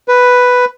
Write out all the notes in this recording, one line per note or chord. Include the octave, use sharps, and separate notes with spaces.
B4